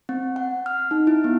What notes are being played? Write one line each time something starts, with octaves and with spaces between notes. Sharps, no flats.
C4
F#5
F6
D#4
E4
B3